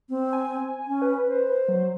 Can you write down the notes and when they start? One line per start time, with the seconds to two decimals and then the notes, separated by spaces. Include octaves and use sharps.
0.09 C4
0.33 G#5
0.87 C#4
1.02 B4
1.28 C5
1.68 F#3